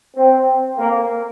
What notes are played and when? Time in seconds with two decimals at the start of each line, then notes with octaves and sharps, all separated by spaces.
0.16 C4
0.78 A#3